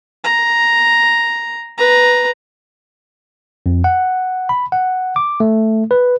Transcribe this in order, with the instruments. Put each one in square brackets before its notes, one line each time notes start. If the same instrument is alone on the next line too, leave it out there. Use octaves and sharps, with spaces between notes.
[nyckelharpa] A#5
B4 A#5
[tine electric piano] F2
F#5
B5
F#5
D6
A3
B4